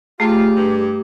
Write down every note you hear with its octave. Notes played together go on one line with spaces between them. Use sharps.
A3 F4 G4 G#4 G5 A#5
G2